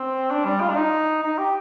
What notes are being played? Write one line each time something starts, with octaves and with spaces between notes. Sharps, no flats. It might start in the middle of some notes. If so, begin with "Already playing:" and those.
Already playing: C4
D4
G3
F4
D4
D#4
D#4
G4